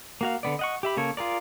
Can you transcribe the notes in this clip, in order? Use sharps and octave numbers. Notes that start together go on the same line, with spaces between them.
A#3 F#4 F5
D3 B3 D5
D#5 F#5 C#6
G4 E5 B5
C#3 A#3 A4 C#5
F4 G#4 A#4 D5